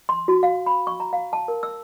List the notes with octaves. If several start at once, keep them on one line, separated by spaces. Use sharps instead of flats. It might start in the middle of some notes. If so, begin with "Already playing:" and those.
C6
F#4
F5
B5
C#6
A#5
F5
A5
A#4
E6